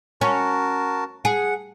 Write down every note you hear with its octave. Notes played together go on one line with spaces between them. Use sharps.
C#4 F#4 A#4 A5
G#4 F#5